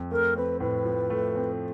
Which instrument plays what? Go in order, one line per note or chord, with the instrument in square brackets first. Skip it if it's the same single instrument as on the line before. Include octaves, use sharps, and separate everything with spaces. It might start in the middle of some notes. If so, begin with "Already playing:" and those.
Already playing: [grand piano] F2
[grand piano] A3 [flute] A#4
[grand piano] C4 [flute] B4
[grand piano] A2 [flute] B4
[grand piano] F3
A3
C4